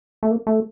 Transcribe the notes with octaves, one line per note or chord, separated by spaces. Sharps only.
A3
A#3
A3